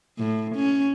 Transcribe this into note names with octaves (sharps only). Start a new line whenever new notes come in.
A2
C#4